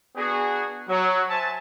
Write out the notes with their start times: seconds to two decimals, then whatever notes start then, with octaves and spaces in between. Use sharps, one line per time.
0.16 B3 D4 F#4 G#4
0.89 F#3
1.29 C5 E5 G#5 A5